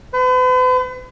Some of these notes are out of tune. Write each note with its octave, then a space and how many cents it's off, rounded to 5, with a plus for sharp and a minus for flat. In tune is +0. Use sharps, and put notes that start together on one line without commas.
B4 +45